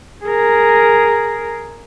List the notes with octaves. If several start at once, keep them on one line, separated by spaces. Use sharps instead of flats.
G#4 A#4